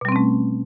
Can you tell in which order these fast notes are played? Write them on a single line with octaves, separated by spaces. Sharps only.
B2 G3 C4 C#4 A3